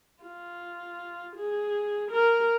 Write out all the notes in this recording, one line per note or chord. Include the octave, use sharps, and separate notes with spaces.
F4
G#4
A#4